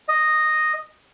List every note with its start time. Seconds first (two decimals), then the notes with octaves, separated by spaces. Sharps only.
0.09 D#5